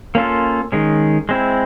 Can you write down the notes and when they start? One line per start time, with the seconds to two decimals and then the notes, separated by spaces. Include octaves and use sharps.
0.15 A#3 C#4 F4 A4
0.72 D#3 G#3 C#4
1.29 G#3 C4 E4